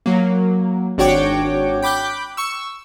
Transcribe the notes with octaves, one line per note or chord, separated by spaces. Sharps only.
F#3 A#3
G#1 D4 F#4 C#5 G5 D6
G5 B5 D6 F#6 G6
C#6 E6